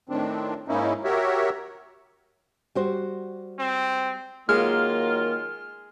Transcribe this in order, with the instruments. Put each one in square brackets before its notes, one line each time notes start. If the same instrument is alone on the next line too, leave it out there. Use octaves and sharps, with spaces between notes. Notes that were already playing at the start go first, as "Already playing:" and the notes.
[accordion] A2 D#3 C4 D4
G#2 A#3 C#4 D#4 E4
F#4 G4 A#4 C#5 E5
[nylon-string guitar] G3 F#4 C5
[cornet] C4
[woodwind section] D#3 F#3 F4 [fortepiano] G#3 [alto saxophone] A#3 [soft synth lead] F6